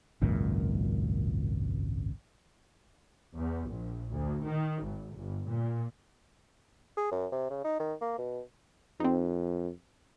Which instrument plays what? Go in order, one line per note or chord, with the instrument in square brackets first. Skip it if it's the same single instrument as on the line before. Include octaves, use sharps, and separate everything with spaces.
[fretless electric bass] G#1 C#2 F#2 A#2
[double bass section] E2
A#1
D2
D#3
G#1
G1
A#2
[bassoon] G#4
F#2
C3
C#3
D#4
D#3
A#3
B2
[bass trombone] F2 [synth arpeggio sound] C4 D#4